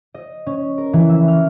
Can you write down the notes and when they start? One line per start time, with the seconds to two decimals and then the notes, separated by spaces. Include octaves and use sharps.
0.14 D#5
0.46 C#4
0.78 A#4
0.93 E3
1.09 E5
1.28 F6